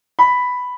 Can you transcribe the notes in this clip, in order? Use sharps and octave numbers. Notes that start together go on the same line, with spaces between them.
B5